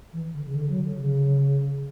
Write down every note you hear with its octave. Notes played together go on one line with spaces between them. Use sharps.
E3
D3
C#3
D3
F#3
D3
C#3